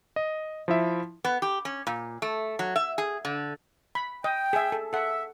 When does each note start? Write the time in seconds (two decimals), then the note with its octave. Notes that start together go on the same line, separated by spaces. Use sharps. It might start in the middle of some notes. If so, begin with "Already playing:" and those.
0.16 D#5
0.68 F3 E4 E5
1.24 B3
1.42 G4
1.65 C#4
1.87 A#2
2.22 A3
2.59 F#3
2.76 E5
2.98 G#4
3.25 D3
3.95 B5
4.24 D#5 G5
4.53 G#4 E5
4.72 A4
4.93 A4 E5 F#5